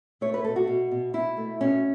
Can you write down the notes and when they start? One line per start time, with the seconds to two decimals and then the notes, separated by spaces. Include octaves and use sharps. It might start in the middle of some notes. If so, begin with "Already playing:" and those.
0.21 A3 C#5
0.34 B4
0.44 B2 A4
0.56 F#4
0.67 B2
0.91 B2
1.13 B2 E4
1.37 A3
1.61 B2 C#4